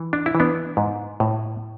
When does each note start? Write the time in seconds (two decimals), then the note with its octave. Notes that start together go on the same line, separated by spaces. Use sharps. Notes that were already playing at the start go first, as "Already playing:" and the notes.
Already playing: E3
0.13 D4
0.26 E4
0.35 E3
0.40 B3 D4
0.77 G#2
1.20 A2